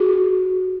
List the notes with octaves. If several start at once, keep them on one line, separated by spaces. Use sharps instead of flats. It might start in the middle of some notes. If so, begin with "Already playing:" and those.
Already playing: F#4 G#4